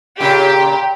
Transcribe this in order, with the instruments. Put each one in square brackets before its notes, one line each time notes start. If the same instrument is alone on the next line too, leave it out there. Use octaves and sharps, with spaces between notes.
[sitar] A#2 C#3 [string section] G4